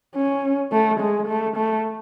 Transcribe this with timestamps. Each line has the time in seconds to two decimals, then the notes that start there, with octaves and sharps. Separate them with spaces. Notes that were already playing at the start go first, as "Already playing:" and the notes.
0.15 C#4
0.72 A3
1.00 G#3
1.28 A3
1.56 A3